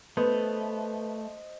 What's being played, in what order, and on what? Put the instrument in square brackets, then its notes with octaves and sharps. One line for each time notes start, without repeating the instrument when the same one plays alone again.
[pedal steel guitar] A3 [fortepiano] B3 [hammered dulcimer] C5 D#5